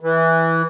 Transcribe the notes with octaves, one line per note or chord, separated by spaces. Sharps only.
E3